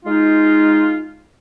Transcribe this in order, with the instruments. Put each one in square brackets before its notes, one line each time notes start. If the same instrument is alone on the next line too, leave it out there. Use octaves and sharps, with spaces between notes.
[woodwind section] G#3 D#4 F4